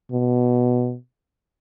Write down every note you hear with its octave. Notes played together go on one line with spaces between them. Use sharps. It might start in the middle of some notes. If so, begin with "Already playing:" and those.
B2